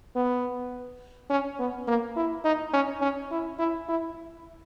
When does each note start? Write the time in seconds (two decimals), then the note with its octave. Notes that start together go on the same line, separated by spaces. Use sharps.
0.16 B3
1.30 C#4
1.59 B3
1.88 A#3
2.17 E4
2.45 D#4
2.74 C#4
3.02 C#4
3.31 E4
3.59 E4
3.89 E4